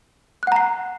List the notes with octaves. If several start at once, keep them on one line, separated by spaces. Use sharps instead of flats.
F#5 A#5 F#6 C7